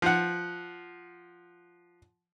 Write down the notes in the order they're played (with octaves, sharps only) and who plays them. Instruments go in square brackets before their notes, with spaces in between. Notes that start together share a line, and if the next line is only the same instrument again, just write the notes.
[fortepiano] F3 F#5